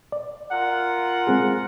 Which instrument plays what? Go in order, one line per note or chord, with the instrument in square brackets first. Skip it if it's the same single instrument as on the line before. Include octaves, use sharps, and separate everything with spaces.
[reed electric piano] D5
[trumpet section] F4 A#4 F#5
[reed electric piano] G#3 C4 G#4